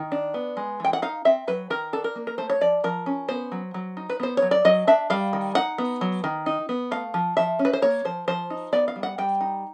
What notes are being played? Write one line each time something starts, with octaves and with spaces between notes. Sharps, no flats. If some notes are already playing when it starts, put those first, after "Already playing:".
Already playing: D#3
D4
B3
G#3
E3 G5
F#5
D#4 F5
C4 E5
F#3 B4
D#3 A#4
D4 A4
A#4
A#3
A#4
A3 C5
C#5
F3 D5
F3 A#4
C#4
B3 C5
F#3
F#3
D#4
B4
B3 C5
F#3 C#5
D5
F#3 D#5
D4 E5
G3 F5
D#3
D#4 F#5
B3
F#3
D#3
D#4
B3
A3 F5
F3
F3 E5
C#4
B4
C5
A#3 C#5
F3 C5
F3 C5
D#4
B3 D5
F5
G3
F#5
G3 G5
D#4